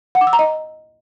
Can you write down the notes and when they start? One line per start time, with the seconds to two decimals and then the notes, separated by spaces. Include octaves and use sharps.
0.15 F#5
0.21 D6
0.27 E6
0.33 A#5
0.39 D#5